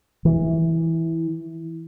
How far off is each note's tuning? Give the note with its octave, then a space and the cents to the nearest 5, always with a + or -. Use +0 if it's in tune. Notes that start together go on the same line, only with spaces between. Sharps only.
E3 -10